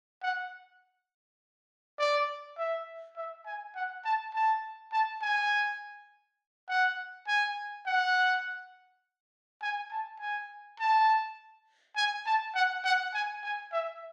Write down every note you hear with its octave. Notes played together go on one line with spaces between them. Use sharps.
F#5
D5
E5
E5
G#5
F#5
A5
A5
A5
G#5
F#5
G#5
F#5
G#5
A5
G#5
A5
G#5
A5
F#5
F#5
G#5
G#5
E5